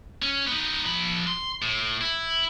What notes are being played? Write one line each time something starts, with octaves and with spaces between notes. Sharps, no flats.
C#4
B3 D#4
F3 B5
C6
A2
E4